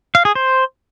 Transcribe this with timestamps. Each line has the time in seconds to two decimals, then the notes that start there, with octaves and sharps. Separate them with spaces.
0.15 F5
0.25 G#4
0.35 C5